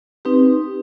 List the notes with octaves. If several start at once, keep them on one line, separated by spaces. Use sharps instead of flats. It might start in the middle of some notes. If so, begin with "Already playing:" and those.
C4 D#4 G4 B4